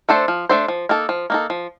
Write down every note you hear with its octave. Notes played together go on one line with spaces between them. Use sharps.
A3 D4 A4 C5
F3
A3 D4 A4 C5
F3
A#3 D#4 A4
F3
A#3 D#4 A4
F3